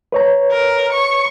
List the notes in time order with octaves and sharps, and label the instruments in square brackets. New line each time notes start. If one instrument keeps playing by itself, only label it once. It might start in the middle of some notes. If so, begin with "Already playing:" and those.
[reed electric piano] B4 C#5 A#5
[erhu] A#4
C#6